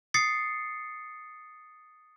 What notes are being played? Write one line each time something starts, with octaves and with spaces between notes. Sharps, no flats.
D#6 A6 C7 C#7